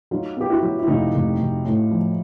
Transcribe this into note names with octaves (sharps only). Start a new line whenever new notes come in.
F#3 D#4 F4
B3 G4
E4 F#4
F#3
E4
F1 D#4 F4
F1
F1
A2
F3